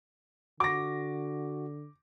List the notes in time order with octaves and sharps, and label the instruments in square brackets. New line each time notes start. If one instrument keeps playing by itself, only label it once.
[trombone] D3 [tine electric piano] F#4 [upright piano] D6 A#6